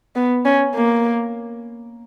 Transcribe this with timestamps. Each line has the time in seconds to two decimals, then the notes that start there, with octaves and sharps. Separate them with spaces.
0.16 B3
0.46 C#4
0.75 A#3